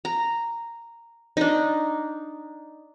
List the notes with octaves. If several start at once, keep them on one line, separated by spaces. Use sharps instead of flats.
A#5
D4 D#4